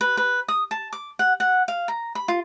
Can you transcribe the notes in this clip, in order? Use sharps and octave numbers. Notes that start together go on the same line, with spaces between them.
B4
B4
D#6
A5
D6
F#5
F#5
F5
A#5
B5
F4